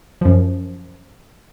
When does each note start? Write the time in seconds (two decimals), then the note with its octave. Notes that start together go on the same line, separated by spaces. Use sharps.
0.21 F#2 F3